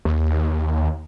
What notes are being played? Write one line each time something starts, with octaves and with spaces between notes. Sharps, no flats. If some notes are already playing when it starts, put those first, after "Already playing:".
D#2